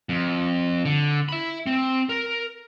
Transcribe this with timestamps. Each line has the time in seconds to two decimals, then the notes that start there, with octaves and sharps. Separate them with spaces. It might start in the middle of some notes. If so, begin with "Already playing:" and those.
0.09 F2
0.85 D3
1.29 E5 B5
1.66 C4
2.09 A#4